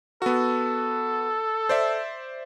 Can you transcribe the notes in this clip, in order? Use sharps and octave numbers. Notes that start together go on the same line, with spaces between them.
B3 F#4 A4
C5 D5 E5